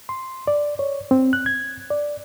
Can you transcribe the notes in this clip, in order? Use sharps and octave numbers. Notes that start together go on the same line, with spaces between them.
C6
D5
C#5
C4
F#6
G#6
D5